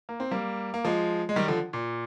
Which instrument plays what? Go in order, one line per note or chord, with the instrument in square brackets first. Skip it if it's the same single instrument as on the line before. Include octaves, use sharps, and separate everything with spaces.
[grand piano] A#3
C4
G3 A#3
A#3
F3 G#3
G#3
D#3 G3
D3 F3
A#2